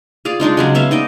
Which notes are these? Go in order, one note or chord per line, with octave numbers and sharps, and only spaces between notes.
F4 G#4 D5 F5
G#3 D4 D#4 F4
C#3 F#3 G#3
B3 C#4 E5 F5
D#4 D5 D#5